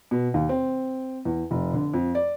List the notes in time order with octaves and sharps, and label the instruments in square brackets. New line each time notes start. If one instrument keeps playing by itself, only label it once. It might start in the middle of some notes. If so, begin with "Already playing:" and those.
[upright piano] B2
D#2
C4
E2
F1
D3
F2
D5